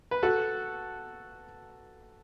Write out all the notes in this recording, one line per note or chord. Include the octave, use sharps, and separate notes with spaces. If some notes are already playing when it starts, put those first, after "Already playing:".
B4
F#4 A4